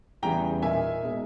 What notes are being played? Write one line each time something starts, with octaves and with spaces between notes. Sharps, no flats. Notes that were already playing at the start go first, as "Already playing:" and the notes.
E2 C#3 E3 G3 B3 G5 A#5
A#2 A#3 D#4 E5 G#5
B2 G#3 D#4